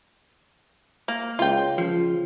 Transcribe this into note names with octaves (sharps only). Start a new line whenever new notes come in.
A#3
C#2 F4 G5
C#3 F3